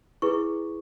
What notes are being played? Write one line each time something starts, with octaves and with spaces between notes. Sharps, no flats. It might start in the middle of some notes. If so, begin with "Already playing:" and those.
E4 G#4 B4 C#6